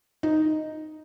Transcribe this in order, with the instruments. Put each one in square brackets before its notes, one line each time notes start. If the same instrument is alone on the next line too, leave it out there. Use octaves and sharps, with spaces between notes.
[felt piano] D#4